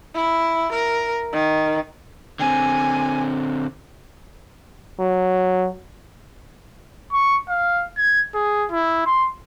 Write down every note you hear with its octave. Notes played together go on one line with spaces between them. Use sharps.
E4
A#4
D#3
D3 C4 G#5
F#3
C#6
F5
G#6
G#4
E4
C6